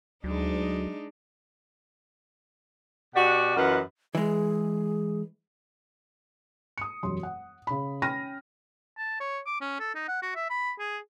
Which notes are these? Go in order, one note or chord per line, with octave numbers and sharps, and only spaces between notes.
D2 F#3 G#3 D4 D#4
B2 F#4 G4 D5 F#5
F#2 E3 F4 B4 D#5 F#5
E3 G#3 G#4
D#6 C#7
E1 F#2 G3 C6
F#5
C#3 B5
C#4 G5 B5 F6 A#6 D#7
A5
C#5
D6
C#4
A4
D#4
F#5
F#4
E5
B5
G#4